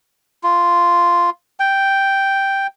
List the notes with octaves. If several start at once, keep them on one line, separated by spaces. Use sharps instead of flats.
F4
G5